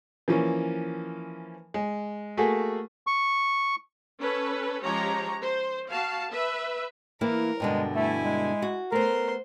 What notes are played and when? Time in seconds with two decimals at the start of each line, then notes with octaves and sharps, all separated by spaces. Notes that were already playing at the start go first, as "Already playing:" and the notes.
0.28 E3 F3 A#3 C#4
1.74 G#3
2.37 A3 A#3 F#4 G#4 A4
3.07 C#6
4.20 C#4 A4 B4
4.83 F3 G#3 C#4 G4 C#5 A#5
5.41 C5
5.90 F#4 F5 A5
6.31 B4 E5
7.21 E3 A#3 E4 A#4
7.60 G2 B2 D3 G#3
7.95 A3 E4 G#5
8.25 G#3
8.62 F#4
8.92 A3 B3 A#4 C5 C6